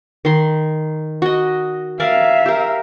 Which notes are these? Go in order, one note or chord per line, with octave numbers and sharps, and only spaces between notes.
D#3 C6
F#4 D#5
A#4 D5 E5 F5 G#5
G4 A#4